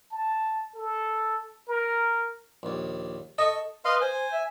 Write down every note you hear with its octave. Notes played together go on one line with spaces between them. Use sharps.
A5
A4
A#4
A#1 D#2
A4 D#5 C#6
B4 D#5 F5 C6
C5 G#5
E5